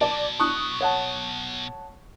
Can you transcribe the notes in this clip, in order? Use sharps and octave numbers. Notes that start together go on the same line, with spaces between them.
B2 F#3 D5 A5
C#6 D#6 F#6
C#5 F#5 A5